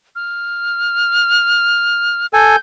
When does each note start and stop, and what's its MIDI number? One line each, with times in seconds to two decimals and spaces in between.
0.15 2.26 89
2.33 2.56 69
2.33 2.56 80
2.33 2.59 91